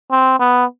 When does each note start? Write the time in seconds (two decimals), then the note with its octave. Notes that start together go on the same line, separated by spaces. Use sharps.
0.11 C4
0.39 B3